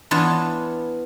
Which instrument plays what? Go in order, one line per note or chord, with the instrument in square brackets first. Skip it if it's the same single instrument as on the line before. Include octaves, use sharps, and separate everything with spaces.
[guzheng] E3 B3 D4 F4 C#5 A5